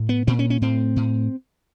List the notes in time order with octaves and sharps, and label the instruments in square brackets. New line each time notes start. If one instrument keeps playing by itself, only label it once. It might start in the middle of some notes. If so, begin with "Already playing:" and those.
Already playing: [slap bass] A2
B3
A#2 C4
C#4
C#4
A2 C4
A2